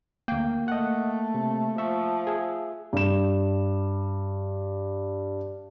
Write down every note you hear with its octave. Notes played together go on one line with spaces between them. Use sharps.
D2 A#3 G5
A3 D#5 F#5
C3
F3 E5 C#6
G#4 E5
G2 E7